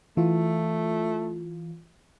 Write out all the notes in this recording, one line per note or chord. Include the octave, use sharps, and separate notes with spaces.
E3 A3 F4